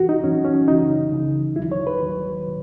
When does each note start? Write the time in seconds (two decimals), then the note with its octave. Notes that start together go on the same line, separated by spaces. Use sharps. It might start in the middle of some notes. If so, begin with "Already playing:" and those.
Already playing: F#2 E3 F#4
0.09 D#4
0.23 F#2 E3 C#4
0.45 C#4
0.67 C#2 C#3 E3 D#4
1.12 C#2 C#3 E3
1.56 D#2 D#3 F#3 E4
1.72 C#5
1.87 B4
2.01 D#2 D#3 F#3